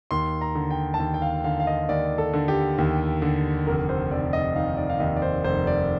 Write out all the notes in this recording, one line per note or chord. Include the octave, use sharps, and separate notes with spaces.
D#2 C6
A#5
D3
G5
A5
D#2 G5
G5
F5
D3 F5
F5
D#5
D#2 D5
A4
D3
G4
D#2
D3
F1 A#4
C5
F1 D5
D#5
D#3 F5
D5
F5
D#2 D#5
D5
C5
F1 C5
D5